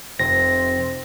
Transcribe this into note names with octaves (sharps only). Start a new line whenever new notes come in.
F1 C4 A#6